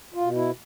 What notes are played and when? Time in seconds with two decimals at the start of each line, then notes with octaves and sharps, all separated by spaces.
0.14 F4
0.21 B2
0.35 E4